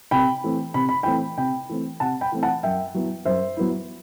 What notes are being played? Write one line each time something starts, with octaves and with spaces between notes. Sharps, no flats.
C3 G5 B5
E3 A3 C4
C3 B5
B5
E3 A3 C4 G5 B5
C3 G5 B5
E3 A3 C4
C3 F#5 A5
G5 B5
E3 A3 C4
F#5 A5
F#2 E5 G5
F#3 B3 E4
F#2 C5 E5
F#3 B3 E4